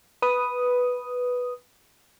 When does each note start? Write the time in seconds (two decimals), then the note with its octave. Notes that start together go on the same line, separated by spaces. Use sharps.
0.22 B4 D#6